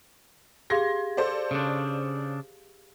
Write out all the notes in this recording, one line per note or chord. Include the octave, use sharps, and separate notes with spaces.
G4 G#4 F5 C6 G#6 A#6
A4 C5 D5
C#3 D4